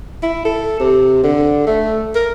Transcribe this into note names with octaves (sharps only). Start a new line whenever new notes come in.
E4
A4
C3
D3
A3
A#4